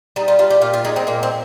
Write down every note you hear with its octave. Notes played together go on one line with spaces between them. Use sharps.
G3 D#4
F4
G3 F4
G4
A#2 F4
F4
G#3 D#4
C4
A#2 A#3
C4